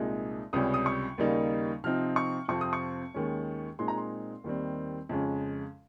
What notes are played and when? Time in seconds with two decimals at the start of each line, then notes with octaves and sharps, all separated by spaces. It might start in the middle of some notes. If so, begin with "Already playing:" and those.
Already playing: C2 A#2 G#3 D#4
0.53 C#2 C3 G3 C#4 D#6
0.74 D#6
0.86 C#6
1.18 D#2 C#3 G3 A#3 D#4
1.84 C3 F3 C4 D#4 F6
2.16 C#6
2.48 F2 C3 F3 C4 C#6
2.61 D#6
2.73 C#6
3.14 D#2 D#3 G#3 C#4
3.79 A#2 G#3 C4 D#4 C6
3.88 A#5
3.98 C6
4.44 D#2 D#3 G3 C4
5.09 F2 C#3 G#3 C#4